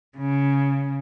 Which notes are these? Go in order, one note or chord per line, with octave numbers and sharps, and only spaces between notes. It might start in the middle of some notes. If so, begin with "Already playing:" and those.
C#3